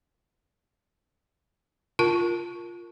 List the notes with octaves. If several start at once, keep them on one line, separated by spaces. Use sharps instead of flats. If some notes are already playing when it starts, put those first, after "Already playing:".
F4 A#4 A5